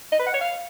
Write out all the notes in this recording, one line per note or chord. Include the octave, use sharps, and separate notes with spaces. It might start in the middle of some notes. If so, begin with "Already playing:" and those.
D#5
B4
F#5
C#5
F5